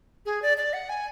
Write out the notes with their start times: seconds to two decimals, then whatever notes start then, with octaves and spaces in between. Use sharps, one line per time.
0.26 G#4
0.42 D5
0.57 D5
0.73 F#5
0.89 G#5